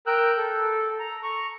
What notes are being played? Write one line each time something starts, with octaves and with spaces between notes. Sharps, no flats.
A#4 G5 E6 F#6 G6
A4
A#5
A#5 C#6